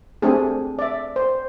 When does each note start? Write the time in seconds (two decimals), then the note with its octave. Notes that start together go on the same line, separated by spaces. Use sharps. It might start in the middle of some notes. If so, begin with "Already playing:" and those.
0.22 A3 C4 D4 G4 G#4
0.79 D5 E5
1.16 C5